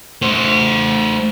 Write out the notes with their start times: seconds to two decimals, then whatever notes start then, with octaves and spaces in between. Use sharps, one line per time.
0.22 A3 C5